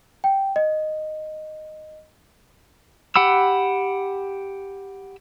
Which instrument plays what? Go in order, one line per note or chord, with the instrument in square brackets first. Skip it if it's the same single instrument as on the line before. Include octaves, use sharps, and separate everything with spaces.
[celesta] G5
D#5
[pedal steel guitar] G4 F#5 B5 E6